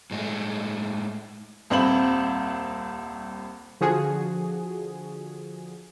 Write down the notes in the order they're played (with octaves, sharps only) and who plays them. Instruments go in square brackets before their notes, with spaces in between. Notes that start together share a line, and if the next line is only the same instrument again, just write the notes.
[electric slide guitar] A2 G#3 A3
[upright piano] D#1 C2 C4 C5 B5 F#7
[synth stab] D3 F3 F#4 G#4